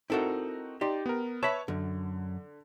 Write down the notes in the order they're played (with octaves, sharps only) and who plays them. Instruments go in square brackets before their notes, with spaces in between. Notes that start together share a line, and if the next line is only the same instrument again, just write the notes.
[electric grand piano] C4 D#4 F#4 [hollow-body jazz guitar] E4 A4 A#4
[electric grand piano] D#4 D5 C6 [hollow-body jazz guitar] G4
[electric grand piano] B3 A#4
[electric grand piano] B4 C#5 A5 [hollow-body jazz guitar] E5 B5
[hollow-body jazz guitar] F#2 [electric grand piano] D3